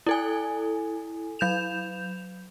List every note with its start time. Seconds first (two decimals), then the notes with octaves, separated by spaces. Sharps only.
0.06 E4 A4 G#5
1.39 F#3 G6 E7 F7